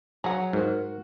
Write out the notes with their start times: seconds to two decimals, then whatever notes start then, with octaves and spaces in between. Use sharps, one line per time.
0.24 F#3 G#4 F#5 A#5
0.53 G#2 F#4 A#4